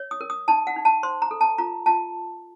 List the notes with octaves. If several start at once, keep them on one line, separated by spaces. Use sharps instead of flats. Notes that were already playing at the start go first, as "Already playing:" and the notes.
Already playing: C#5
D#6
A#4
D#6
D#4 A5
F#5
D#4
A5
C5 C6
A#5
A4
A5
F4 A#5
F4 A5